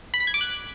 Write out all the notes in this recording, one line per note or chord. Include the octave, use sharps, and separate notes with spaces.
B5
B6
G#6
D6
F#6